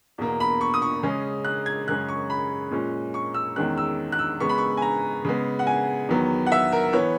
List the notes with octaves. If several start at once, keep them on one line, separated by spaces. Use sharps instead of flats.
E2 B2 A#3
B5
C#6
D#6
C#6
C#3 G#3 C#4
F#6
G#6
F#2 C#3 G#3 C#4 F#6
C#6
B5
A#2 G#3 C#4
C#6
E6
E2 D#3 G#3 C#4 F#6
E6
F#6
E6
C#3 G#3 B3 C#6
B5
C#6
G#5
A#5
C#3 G#3 B3
F#5
G#5
E2 D#3 F#3 B3
F#5
E5
A#4
E3 B3 C#5